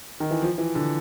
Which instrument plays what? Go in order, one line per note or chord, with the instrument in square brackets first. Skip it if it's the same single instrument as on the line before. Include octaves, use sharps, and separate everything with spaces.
[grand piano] D#3
E3
F3
E3
D3